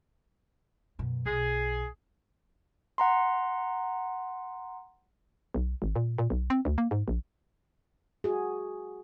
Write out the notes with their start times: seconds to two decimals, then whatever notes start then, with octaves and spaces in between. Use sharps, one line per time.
0.99 F#2 B2
1.26 B1 G#4
2.98 F#5 A#5 C6
5.54 B1
5.82 G#1
5.96 A#2
6.18 A#2
6.30 B1
6.50 C4
6.65 D2
6.78 A#3
6.91 G#2
7.08 A#1
8.24 F#4 G#4